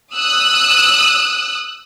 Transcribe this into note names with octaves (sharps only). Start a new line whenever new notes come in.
D#6 E6 F#6